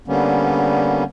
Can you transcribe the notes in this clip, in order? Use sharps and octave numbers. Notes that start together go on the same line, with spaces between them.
D3 G3 A#3 B3 C#4